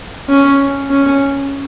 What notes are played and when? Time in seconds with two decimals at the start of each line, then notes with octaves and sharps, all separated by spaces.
0.29 C#4
0.91 C#4